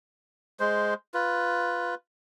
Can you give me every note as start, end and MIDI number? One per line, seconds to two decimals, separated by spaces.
0.60 0.94 56
0.60 0.94 72
1.14 1.95 65
1.14 1.95 71